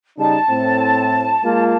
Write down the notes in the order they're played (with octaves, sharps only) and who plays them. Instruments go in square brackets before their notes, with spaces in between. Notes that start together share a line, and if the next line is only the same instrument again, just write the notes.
[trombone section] C#3 G3 D#4 [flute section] A5
[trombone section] A2 C4
G#3 A#3 F4